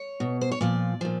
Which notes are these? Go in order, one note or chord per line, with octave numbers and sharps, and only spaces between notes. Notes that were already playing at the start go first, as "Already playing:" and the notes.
Already playing: C#5
B2
C5
C#5
A#2 F3 D5
A#2 F3